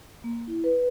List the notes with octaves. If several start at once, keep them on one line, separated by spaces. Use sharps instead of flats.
A#3
E4
B4